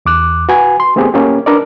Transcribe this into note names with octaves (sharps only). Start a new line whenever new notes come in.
E2 D6 F#6
F#4 B4 G#5
C6
A3 B3 C4 G4 G#4
A#3 C#4 G4
D4 A#4 B4 D5